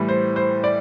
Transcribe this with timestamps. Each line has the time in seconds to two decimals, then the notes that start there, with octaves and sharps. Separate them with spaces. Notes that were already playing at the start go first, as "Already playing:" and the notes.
Already playing: A2 E3 G3
0.09 C5
0.36 C5
0.64 D5